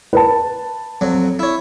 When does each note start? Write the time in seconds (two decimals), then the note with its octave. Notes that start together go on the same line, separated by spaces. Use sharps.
0.13 B4 A5
1.01 F2 F#3
1.39 E4 C#5